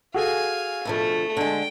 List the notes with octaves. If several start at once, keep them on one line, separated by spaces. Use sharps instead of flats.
F#4 G#4 A4 F5 G#5
D2 B2 F3 A3
D3 G#3 G5